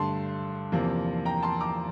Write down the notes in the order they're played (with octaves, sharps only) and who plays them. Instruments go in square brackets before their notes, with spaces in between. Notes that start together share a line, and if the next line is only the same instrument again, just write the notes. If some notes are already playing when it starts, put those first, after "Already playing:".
Already playing: [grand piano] G2 D3 A3 A5 C6
E2 C3 F3 A#3
G5 A#5
A5 C6
A#5 D6